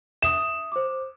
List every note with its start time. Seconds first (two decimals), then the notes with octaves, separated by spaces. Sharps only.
0.22 E5 D#6 E7
0.72 C5 D6